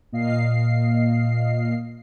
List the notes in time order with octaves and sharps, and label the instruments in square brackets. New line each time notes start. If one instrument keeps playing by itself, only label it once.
[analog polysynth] A#2 D#5 F5 C7